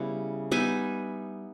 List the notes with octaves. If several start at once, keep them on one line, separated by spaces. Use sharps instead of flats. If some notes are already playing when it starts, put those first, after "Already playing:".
Already playing: C#3 G3 B3 E4
G3 B3 D#4 E5 G#5